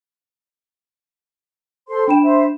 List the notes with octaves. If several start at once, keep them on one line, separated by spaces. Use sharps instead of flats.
A4 C5 C6
D4 G5 B5 E7
C5 E5